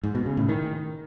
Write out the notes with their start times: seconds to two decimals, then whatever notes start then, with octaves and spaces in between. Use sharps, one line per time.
0.04 G#2
0.15 B2
0.26 C#3
0.37 A2
0.49 D#3